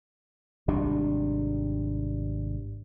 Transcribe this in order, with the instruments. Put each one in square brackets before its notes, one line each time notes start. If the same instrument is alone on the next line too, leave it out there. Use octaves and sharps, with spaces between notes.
[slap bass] G#1 C3 G3 D4